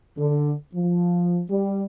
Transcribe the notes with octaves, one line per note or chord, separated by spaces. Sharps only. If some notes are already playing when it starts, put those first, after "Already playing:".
D3
F3
G3